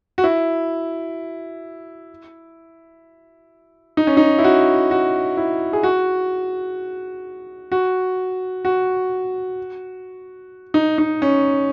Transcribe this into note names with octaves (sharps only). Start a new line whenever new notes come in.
F#4
E4
D#4
C#4
D#4
E4
F#4
F#4
E4
G#4
F#4
F#4
F#4
D#4
D#4
C#4